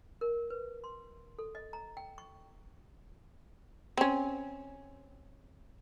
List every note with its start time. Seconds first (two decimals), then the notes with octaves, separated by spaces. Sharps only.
0.21 A#4
0.50 B4
0.84 C6
1.39 A4
1.55 D#5
1.73 A#5
1.97 G5
2.18 C#6
3.97 C4 C#4